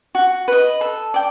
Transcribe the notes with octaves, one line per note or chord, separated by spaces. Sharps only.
F#4
B4 D#5
A4
D5 G5